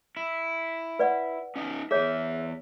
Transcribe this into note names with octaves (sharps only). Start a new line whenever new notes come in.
E4
B4 D5 F#5
C#4 D#4 D#5
E2 G#4 C#5 E5